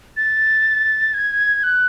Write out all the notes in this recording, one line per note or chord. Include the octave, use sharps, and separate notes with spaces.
A6
G#6
F#6